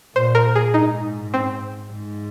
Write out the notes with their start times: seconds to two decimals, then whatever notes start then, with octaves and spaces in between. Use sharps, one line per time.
0.16 A#2 C5
0.35 A#4
0.56 G#4
0.74 G#2 D#4
1.34 C4
1.92 G#2